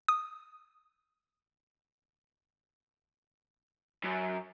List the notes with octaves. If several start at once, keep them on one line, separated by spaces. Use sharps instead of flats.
D#6
F#2